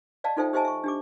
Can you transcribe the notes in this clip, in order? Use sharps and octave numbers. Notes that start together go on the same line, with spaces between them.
D5 D#5 F5 A5
D#4 F4 A4 C5 E5 G5
G4 C5 D#5 E5 G#5 A5
E5 C#6
D4 G4 D6